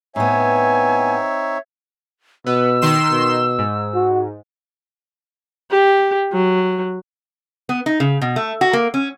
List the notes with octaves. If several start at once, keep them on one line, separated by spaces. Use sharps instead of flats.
A2 B3 C4 D#4 C#5 E5 G#5
B2 B3 E6
D#3 C6 E7
B2
G#2
F#4
G4
F#3
B3
D#4
C#3
B2
A3
F#4
A#3
C#4